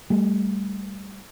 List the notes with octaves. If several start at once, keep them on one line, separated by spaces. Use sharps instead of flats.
G3 A3